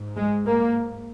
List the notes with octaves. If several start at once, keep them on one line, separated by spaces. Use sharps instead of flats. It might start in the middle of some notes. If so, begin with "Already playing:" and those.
Already playing: G#2
G#3
A#3